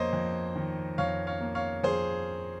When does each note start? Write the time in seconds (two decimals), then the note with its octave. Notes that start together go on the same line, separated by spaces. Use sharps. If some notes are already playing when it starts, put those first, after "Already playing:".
Already playing: F2 A#3 C5 C#5 D#5
0.13 F2
0.56 D#3
0.98 F2 C#5 F5
1.27 C#5 F5
1.41 A#3
1.55 C#5 F5
1.83 F2 G#4 C5